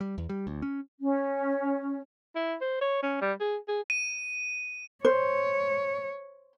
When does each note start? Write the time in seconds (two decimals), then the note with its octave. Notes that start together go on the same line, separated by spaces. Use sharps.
0.01 G3
0.18 E2
0.29 G3
0.47 D2
0.62 C#4
1.00 C#4
2.35 E4
2.61 C5
2.81 C#5
3.03 C#4
3.22 G3
3.40 G#4
3.68 G#4
3.90 D#7
5.05 C5 C#5